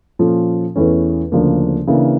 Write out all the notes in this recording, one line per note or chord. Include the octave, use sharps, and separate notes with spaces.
A#2 F3 C#4 F4 A4
E2 E3 A3 C#4
D2 C#3 F3 A#3 D4
C#3 E3 A#3 D4